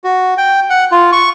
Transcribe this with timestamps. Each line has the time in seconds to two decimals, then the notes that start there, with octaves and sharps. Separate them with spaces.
0.04 F#4
0.38 G5
0.70 F#5
0.92 F4
1.12 C#6